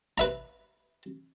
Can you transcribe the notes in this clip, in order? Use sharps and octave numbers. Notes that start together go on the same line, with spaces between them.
B4 E5 A#5